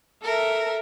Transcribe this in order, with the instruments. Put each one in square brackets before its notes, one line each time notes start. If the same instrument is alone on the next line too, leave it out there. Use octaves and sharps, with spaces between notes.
[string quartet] A4 A#4 E5